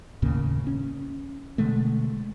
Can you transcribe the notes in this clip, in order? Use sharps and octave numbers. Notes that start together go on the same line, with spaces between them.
D#2 A2 C#3 A#3
C#4
B2 D3 G#3 A3